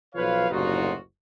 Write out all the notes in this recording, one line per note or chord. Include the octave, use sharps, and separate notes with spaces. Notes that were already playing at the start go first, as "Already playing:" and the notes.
B1 F3 B4 C#5 F5
F#1 C2 A2 D#4 F4 F#4